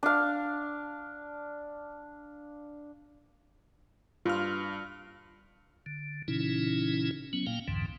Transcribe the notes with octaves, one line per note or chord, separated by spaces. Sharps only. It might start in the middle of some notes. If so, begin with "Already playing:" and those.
D4 F5
G2 F4 F6
D3
A#2 C#3 E3 C#4 D#4 E4
F#3 B3 C#4
A#2 A#3 F5 G5
C2 F2 G#2 D3 E3